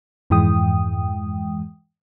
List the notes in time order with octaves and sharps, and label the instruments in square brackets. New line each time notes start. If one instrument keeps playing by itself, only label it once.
[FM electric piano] F2 G#2 E3 G#3 G5 D#6